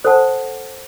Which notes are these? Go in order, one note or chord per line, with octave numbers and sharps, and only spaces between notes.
A4 C5 F#5 A5